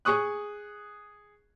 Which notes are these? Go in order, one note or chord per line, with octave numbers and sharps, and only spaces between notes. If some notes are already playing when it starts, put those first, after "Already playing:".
G#4 C#6 D#6 F#6